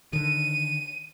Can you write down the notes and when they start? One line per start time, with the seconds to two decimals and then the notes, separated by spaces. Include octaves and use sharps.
0.13 D3 D#3 D#7